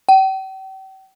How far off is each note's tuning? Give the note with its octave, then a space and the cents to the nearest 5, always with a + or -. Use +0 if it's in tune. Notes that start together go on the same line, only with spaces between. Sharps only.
G5 -40